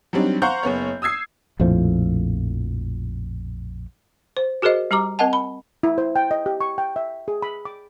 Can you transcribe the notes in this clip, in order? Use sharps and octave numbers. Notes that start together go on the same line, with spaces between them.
F#3 G3 C4 D4 D#4
C5 F5 F#5 A#5 C#6 G6
F#1 B3 C#5
D#6 E6 G#6 C7
A#1 F2 A2 F3
C5
F#4 G#4 A#4 C5 D#5
G3 G4 A#5 D6
C4 A#4 D#5 F#5 A5
B5
E4
C5
G5
D#5
G4
C#6
G5
E5
G#4
B5
D6